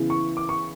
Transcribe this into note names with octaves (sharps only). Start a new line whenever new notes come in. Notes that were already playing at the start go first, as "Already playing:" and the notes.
Already playing: C#3 E3 B3 E4
C#6
D6
C#6